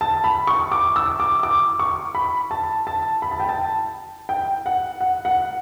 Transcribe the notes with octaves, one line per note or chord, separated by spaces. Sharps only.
A5
B5
C#6
D6
E6
D6
D6
C#6
B5
A5
A5
B5
A5
G5
A5
G5
F#5
F#5
F#5